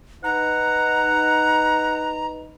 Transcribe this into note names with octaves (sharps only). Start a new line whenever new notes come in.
D#4 B4 F#5 A#5